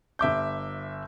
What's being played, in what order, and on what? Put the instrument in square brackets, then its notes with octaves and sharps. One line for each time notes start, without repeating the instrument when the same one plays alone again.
[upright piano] G1 E5 D6 G6